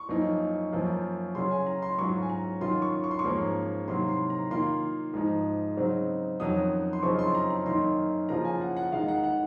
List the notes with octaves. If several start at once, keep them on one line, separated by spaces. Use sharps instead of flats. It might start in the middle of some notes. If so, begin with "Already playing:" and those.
Already playing: C#6
F#2 F3 A#3 D#4
F#2 F3 A#3
C#3 F#3 C#4 C6
G#5
A#5
C6
G#2 F#3 C#4 F4 C#6
G#5
A#5
D#3 F#3 C#4 F4 C6
C#6
C#6
C6
C#6
G#2 F3 A#3 C#4
C3 D#3 F#3 A#3 C6
C6
A#5
D#3 A#3 F4 C6
G#2 F3 G#3 D#4
C#3 F#3 C4 D#4
F2 D#3 F#3 C#4 D#6
C6
F#2 C#3 F3 C4 D#4 C#6
C6
A#5
A#5
F#2 D#3 A#3 D#4 C6
C#3 F3 A#3 C#4 F4 A#5
G#5
F#5
F#5
D#3 G#3 D#4 F5
F#5
F#5